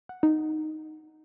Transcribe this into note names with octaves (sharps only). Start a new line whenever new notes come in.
F#5
D#4